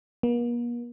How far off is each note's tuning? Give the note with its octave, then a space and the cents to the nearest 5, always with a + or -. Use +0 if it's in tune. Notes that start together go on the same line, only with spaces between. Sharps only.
A#3 +45